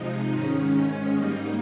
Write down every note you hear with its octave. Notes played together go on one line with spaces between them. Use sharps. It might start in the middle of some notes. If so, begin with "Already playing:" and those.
Already playing: C3 F3 G#3 D#4
G#2 D#3 G#3 C#4
G#2 G3 A#3 D#4